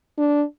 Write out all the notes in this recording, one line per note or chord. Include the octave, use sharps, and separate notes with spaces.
D4